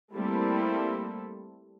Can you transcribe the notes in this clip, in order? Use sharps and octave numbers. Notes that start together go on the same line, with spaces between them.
G3 A3 A#3 C4 E4 A4